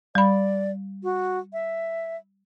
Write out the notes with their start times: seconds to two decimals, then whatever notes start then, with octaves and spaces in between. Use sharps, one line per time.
0.15 G3 D5 B5
1.03 F#4
1.53 E5